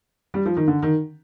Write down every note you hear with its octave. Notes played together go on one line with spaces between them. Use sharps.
G3
F3
D#3
D3
D#3